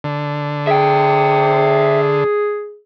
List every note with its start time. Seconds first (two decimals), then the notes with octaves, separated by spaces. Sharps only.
0.04 D3
0.67 G#4 E5 G5